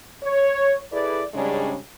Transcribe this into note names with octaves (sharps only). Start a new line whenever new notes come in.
C#5
E4 G#4 A4 B4 D5
G#2 C#3 G3 G#3 C#4 D4